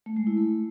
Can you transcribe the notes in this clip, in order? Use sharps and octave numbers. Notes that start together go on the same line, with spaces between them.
A3
G#3
E4
A3